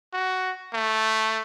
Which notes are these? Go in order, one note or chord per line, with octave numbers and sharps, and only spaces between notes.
F#4
A3